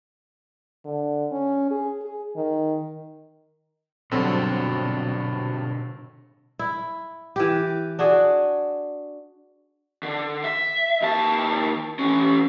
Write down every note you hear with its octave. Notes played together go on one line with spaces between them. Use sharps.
D3
C#4
G#4
G#4
D#3
G2 B2 D3 F#3 C4 A4
E4
E3 G4
D4 F#4 G#4
D3
E5
D#2 A5
E3 C#4